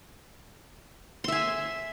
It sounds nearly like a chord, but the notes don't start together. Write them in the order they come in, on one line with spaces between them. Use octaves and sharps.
C6 E5 G#5